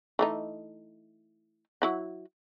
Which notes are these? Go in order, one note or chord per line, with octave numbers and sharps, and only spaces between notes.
E3 A3 D#4
F#3 E4 F#5